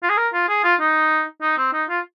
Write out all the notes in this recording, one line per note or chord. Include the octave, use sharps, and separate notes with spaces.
F4
G#4
A#4
F4
G#4
F4
D#4
D#4
C4
D#4
F4